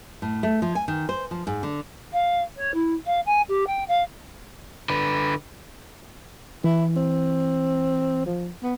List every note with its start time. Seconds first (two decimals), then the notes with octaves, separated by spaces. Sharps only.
0.22 A2
0.43 A3
0.62 F3
0.75 G#5
0.88 D#3
1.09 C5
1.31 F3
1.47 G#2
1.63 D3
2.13 F5
2.56 C#5
2.74 E4
3.06 F5
3.26 G#5
3.48 G4
3.67 G5
3.88 F5
4.90 D3 B4
6.64 E3 E4
6.96 C4
8.26 F3
8.63 B3